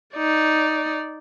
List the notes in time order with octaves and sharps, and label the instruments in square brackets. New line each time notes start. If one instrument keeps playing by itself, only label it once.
[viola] D#4 D5